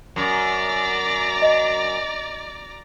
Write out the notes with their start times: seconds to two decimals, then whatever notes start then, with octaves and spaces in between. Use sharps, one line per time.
0.16 F#2 D5 A#5
1.42 D#5